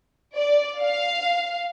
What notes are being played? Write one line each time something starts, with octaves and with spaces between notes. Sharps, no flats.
D5
F5